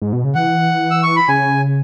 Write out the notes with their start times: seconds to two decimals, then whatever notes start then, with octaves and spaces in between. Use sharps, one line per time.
0.02 G#2
0.13 B2
0.24 C#3
0.35 E3 F#5
0.91 E6
1.03 C#6
1.16 B5
1.28 C#3 G#5